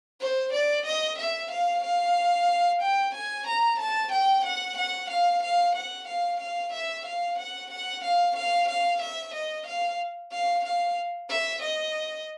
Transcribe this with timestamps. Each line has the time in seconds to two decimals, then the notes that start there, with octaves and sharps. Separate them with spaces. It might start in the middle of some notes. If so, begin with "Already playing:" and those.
0.21 C5
0.53 D5
0.86 D#5
1.18 E5
1.51 F5
1.84 F5
2.82 G5
3.14 G#5
3.47 A#5
3.80 A5
4.12 G5
4.45 F#5
4.77 F#5
5.10 F5
5.43 F5
5.75 F#5
6.08 F5
6.40 F5
6.73 E5
7.06 F5
7.39 F#5
7.71 F#5
8.04 F5
8.36 F5
8.69 F5
9.02 E5
9.34 D#5
9.66 F5
10.32 F5
10.65 F5
11.30 E5
11.62 D#5